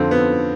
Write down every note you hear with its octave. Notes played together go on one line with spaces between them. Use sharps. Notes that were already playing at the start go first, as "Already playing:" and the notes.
Already playing: F2 D3 C4
B3